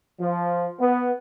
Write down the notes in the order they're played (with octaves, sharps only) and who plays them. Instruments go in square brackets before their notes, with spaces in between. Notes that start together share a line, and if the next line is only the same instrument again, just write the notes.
[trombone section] F3
B3